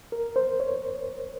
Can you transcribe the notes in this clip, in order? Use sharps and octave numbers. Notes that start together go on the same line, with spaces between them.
A#4
C5
C#5